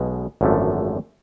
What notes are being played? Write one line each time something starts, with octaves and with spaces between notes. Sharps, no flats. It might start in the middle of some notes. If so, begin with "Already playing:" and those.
Already playing: B1 B2 G#3
G#1 F#2 D3 F3 A3